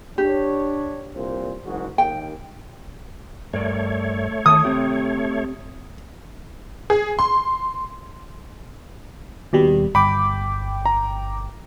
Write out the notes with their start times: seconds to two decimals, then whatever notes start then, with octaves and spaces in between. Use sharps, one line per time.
0.18 D4 G4 C#5
1.15 C2 A#2 C5
1.66 F#1 G#2 F#4
1.98 D#2 G5
3.53 G2 A3 A#4 C#5 D5
4.46 D#3 A5 D#6
4.65 C4 G4
6.90 G#4
7.19 C6
9.53 D#2 B2 G3
9.95 G1 G5 B5 D6
10.86 A#5